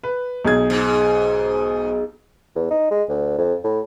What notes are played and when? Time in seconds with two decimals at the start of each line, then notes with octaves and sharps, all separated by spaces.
0.03 B4
0.45 B1 G#4 G#6
0.70 G#2
2.55 E2
2.71 D#4
2.91 G#3
3.09 D2
3.38 F2
3.64 A2